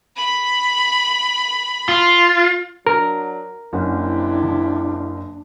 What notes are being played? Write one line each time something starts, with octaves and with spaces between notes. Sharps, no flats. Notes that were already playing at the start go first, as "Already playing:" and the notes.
B5
F4
F#3 D4 A#4
F#1 C3 F3 C#4 D4 E4 F#5